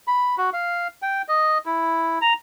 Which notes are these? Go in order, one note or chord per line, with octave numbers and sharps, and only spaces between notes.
B5
F#4
F5
G5
D#5
E4
A#5